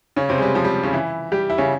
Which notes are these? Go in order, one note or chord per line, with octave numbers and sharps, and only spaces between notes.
C#3 C#4
C3 C4
G#3
G3
F3
G3
C#3 C#4
E3 E4
G3 G4
E4
C#3 C#4